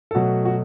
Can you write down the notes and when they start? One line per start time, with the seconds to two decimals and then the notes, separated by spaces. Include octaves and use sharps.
0.11 A4
0.15 B2 F#3 A3 F#4
0.45 F#4